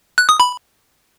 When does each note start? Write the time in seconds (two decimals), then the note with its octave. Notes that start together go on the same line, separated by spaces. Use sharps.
0.18 F#6
0.29 D#6
0.40 B5